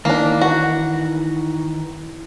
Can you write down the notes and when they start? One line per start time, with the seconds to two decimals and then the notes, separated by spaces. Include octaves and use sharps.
0.05 D#3 E3 A#3 D4 D#4
0.41 F#4